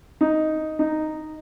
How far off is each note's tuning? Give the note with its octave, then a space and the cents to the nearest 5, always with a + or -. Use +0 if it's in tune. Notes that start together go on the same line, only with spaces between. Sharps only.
D#4 +5
D#4 -5